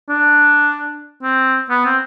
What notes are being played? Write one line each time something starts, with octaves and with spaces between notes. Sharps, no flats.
D4
C4
B3
C4